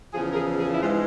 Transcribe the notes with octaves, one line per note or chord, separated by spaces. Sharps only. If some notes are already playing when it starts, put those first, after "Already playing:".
E2 C#3 F3 G#4
A#4
G#4
G#4
E4
G#2 E3 G#3 C4 F4